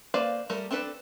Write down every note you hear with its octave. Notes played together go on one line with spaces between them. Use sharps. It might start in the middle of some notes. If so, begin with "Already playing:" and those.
A#3 B4 C5 D5 F5
G3 A3 A#4
C4 D4 A4 B4